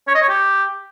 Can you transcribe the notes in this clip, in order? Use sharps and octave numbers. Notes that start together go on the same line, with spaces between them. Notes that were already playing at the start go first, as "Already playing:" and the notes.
C#5
D#5
C#5
G4